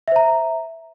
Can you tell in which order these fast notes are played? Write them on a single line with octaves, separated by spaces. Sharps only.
E5 C5 A#5